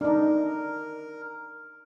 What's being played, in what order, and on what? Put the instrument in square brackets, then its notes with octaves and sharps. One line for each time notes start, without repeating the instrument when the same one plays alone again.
[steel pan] D4 D#4 [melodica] A#4